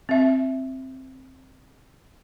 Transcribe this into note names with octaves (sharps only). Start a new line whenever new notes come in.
C4 E5